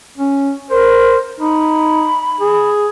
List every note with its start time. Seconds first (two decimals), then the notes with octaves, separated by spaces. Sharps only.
0.18 C#4
0.71 A#4 C5
1.40 D#4 B5
2.41 G#4